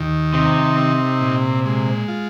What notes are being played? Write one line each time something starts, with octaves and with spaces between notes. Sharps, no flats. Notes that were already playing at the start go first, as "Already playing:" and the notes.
Already playing: D#2 D#3
C3 D#4
C4
A#2
G#3
F4